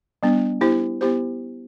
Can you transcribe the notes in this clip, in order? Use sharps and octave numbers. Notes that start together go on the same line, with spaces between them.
G3 B3 D4
B3 E4 G4 C5
B3 E4 G4 C5